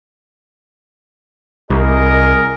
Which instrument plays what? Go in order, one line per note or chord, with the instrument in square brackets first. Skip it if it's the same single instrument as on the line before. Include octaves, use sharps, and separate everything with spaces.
[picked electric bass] C2 [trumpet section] G#4 A#4 D#5